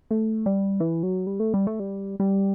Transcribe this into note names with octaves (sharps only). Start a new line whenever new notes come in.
A3
G3
E3
F#3
G3
A3
G3
A3
G3
G3